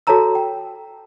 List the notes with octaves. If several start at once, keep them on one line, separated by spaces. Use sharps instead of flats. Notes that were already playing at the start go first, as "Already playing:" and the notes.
F#4 A4 C#5 A5 A#5 E6
G5